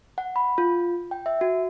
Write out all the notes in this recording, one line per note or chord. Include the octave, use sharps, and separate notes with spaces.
F#5
B5
F4
G5
E5
F#4